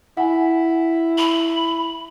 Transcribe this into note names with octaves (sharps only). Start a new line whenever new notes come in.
E4 F#5 G#5
B5